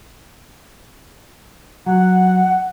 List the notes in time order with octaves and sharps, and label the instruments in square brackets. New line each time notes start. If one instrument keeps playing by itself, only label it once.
[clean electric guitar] F#3 [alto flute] F#5